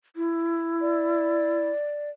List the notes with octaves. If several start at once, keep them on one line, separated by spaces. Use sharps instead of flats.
E4
D5